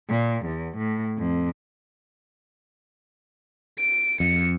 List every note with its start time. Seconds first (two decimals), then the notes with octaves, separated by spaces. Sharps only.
0.10 A#2
0.46 E2
0.77 A2
1.18 F2
3.79 D7
4.20 F2 C#7